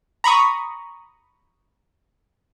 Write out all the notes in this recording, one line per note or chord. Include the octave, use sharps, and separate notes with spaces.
A#5 B5 C#6 D#6